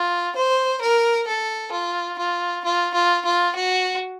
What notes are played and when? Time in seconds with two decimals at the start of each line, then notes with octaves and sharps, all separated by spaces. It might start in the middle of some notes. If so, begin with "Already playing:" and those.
Already playing: F4
0.36 C5
0.81 A#4
1.27 A4
1.72 F4
2.18 F4
2.64 F4
2.94 F4
3.25 F4
3.55 F#4